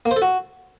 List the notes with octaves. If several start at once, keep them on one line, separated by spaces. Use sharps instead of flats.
A#3
C5
A4
F#4